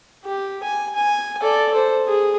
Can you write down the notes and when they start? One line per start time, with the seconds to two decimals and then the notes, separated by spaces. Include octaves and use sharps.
0.25 G4
0.63 G#5
0.95 G#5
1.42 A4 D5
1.73 A4 C5
2.07 G#4